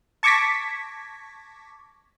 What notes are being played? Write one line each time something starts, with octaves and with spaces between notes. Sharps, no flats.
A5 C#6 D6 G#6 A#6 B6